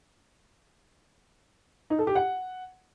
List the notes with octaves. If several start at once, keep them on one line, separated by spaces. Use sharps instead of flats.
D#4
A4
G4
F#5